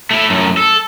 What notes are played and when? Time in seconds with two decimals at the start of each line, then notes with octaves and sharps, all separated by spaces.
0.11 A3 E4
0.30 F#2 A2
0.57 A4